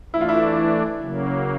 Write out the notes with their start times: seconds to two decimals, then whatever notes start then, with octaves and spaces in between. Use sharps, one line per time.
0.13 E3 A3 D4 E4
0.21 F4
0.29 E4
1.00 C#3 F#3 A#3